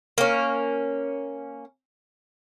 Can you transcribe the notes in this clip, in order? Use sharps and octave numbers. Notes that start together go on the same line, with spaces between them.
A#3 C#4